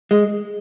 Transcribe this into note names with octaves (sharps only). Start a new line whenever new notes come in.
G#3